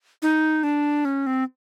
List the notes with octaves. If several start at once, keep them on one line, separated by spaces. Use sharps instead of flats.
D#4
D4
C#4
C4